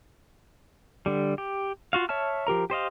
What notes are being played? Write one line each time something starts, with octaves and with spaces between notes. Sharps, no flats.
D3 G3
G4
F4 F#4 F5
C#5 E5 A5 F6
F3 G4 A#4 A#5
G4 C5 D#5 F5